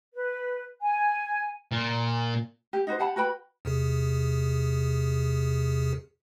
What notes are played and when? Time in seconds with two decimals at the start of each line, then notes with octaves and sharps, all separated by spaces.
0.14 B4
0.82 G#5
1.72 A#2
2.73 G4
2.87 D#4 F#4 B4 C5
2.99 G4 F#5 A5 B5
3.16 F#4 B4 G5 B5
3.65 E2 C3 G#4